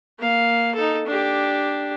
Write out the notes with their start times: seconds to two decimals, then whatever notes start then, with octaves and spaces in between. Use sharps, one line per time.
0.19 A#3 F5
0.75 D#4 A4
1.07 D4 G4